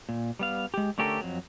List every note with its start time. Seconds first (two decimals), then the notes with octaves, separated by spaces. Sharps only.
0.09 A#2
0.39 G3 B3 F5
0.74 G#3 G4
0.98 D3 A3 C#4 G4 A4 A#4
1.21 F2 F#3